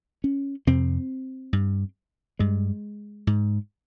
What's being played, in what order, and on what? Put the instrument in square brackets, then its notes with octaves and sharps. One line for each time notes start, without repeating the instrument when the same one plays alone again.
[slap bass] C#4
F2 C3 C4
G2
G2 G#3
G#2